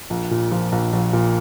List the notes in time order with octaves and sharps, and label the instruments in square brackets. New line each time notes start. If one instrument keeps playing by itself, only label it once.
[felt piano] A#1
A#2
F3
A#1
A#1
A#2